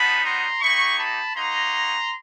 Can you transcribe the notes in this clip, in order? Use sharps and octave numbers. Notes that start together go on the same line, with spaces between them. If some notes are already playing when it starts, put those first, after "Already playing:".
Already playing: G3 B3 D#4 F#4 A5 B5
A#5 C6
A#3 D#4 G4 B5 C#6
A5 B5
A#3 D#4 F#4 A#5 C6